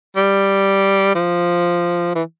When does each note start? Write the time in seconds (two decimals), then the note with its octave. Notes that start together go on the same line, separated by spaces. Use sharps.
0.16 G3
1.15 F3
2.15 E3